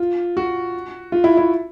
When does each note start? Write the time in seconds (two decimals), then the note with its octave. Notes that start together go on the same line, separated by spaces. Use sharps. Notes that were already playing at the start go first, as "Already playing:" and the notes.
Already playing: F4
0.37 F#4
1.12 F4
1.24 E4
1.37 E4